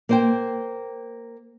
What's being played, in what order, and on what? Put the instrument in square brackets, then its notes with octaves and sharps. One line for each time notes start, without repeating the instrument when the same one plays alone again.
[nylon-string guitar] A#3 C5 G5